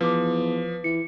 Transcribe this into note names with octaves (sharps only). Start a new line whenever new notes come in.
E2 F3 B4 D6
E3 C#7